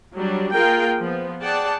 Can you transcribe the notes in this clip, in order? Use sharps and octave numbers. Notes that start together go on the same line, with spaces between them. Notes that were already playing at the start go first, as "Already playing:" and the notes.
F#3 G3 D4
A#3 F4 G#4 A#4 G5
F3 B3
G#4 D5 F#5 G5 A5